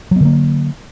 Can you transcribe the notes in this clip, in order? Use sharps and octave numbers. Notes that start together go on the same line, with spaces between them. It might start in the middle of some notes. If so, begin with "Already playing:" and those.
D3 F#3 A#3 B3